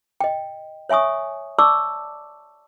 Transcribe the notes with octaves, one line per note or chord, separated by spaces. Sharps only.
D#5 G5
C#5 E5 G#5 C#6 D#6
D5 A5 C#6 D6 E6